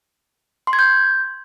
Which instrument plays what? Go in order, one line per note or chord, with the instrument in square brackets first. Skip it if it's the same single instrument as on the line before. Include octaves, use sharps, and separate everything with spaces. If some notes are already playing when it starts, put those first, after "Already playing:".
[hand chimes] C6
G#6
G6